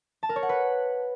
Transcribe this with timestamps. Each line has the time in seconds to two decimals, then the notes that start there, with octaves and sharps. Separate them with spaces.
0.23 A5
0.29 A#4
0.36 C#5
0.43 F#5
0.49 B4